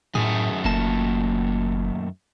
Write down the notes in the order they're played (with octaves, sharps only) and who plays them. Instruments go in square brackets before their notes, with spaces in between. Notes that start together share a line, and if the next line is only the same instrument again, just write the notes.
[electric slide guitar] F#2 D#3 A3 [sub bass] A2 [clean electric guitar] G#4
[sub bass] F#1 [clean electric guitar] A#2 A#3 A5